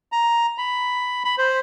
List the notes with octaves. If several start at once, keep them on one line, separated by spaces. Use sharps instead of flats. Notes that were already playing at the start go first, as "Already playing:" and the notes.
A#5
B5
B5
C5